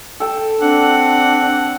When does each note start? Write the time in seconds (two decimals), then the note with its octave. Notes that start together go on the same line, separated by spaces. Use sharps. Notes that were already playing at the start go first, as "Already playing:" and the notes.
0.20 A4 G5
0.61 C4 D4 F#5